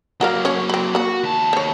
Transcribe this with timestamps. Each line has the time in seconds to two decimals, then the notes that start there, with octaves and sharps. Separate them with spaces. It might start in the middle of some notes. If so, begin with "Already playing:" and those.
0.21 F#3 A#3 F#4 A#4 F5
0.45 C#4 C#5
0.70 C4 B5
0.95 A#3 F#4 B5
1.24 D#2 A5
1.53 C5 C#5